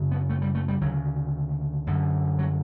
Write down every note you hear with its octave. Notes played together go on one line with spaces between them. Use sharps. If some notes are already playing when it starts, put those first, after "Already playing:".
Already playing: F#2 C#3
B3
A3
G3
A3
G3
D2 C#3 F#3
F#2 D3
F#3